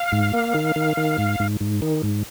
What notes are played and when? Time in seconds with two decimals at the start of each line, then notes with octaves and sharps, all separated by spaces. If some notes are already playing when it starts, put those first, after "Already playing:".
Already playing: F5
0.12 G#2
0.34 A#3
0.54 D#3
0.76 D#3
0.97 D#3
1.18 G#2
1.40 G#2
1.61 G#2
1.82 D#3
2.03 G#2